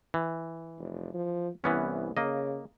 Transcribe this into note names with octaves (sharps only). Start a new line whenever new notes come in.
E3
F1
F3
C2 E3 B3 C#4
C#3 A#3 D#5